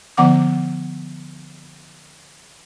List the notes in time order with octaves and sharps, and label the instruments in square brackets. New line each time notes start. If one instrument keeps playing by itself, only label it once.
[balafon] D3 F3 B3 F#5 D6